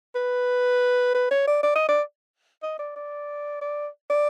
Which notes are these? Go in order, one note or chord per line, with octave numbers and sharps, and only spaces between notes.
B4
B4
C#5
D5
D5
D#5
D5
D#5
D5
D5
D5
D5